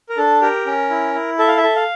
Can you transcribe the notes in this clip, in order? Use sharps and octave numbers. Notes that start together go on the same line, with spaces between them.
A#4
D4 A4
G4 A#4
C#4
E4
E4
A4 E5
F5
E5
A4
F5